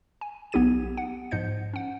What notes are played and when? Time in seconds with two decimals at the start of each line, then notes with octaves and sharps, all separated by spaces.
0.21 G#5
0.52 B1 B3 D#4 G4 G#6 D#7
0.97 F#5
1.31 G#2 F3 C5 D#5 G6 C#7
1.73 C#4 F#5